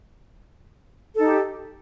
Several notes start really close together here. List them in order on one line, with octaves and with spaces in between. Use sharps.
A4 D#4 G4